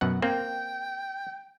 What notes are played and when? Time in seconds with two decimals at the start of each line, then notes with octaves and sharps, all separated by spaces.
0.01 F#2 B2 F#5
0.22 A#3 C4 G5